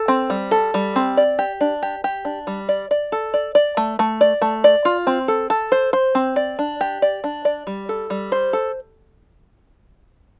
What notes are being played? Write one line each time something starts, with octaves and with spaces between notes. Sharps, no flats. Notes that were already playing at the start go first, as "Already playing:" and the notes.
Already playing: A4
C4
G3
A4
G3
C4
D5
G4
D4
G4
G4
D4
G3
D5
D5
A4
D5
D5
A3
A3
D5
A3
D5
F4
C4
A4
A4
C5
C5
C4
D5
D4
G4
D5
D4
D5
G3
A4
G3
C5
A4